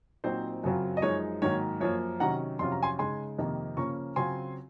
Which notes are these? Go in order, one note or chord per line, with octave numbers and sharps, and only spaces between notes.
A#2 F#3 C4 D#4 C5
F#2 C#3 F#3 C4 F4
D#5
F#2 F3 G#3 D#4 C#5
G#2 D#3 F#3 A#3 C#5
F#2 F3 A#3 C#5
C3 D#3 F#3 C#4 F#5 A#5
F2 C3 F#3 C#4 F4 C6
A#5
G#5 C6
C#3 G#3 D#4 G#5 C6
F2 C3 D#3 A#3
C#3 F3 A#3 C#4 A#5 C#6
C#3 F#3 C4 F4 G#5 C6